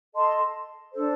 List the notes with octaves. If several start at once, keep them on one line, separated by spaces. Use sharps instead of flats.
A4 D#5 A5 C6
D4 A4 C5